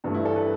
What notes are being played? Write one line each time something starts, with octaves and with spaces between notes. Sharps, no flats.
G2 E3 A3 D4
E4
A4
B4